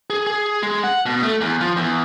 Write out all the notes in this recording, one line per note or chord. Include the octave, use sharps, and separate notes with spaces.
G#4
G#4
G#3
F#5
B2
A3
E2
F3
E2